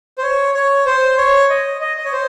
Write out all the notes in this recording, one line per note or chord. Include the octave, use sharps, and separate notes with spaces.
C5
C#5
C#5
C5
C#5
D#5
D#5
D#5
C#5
C5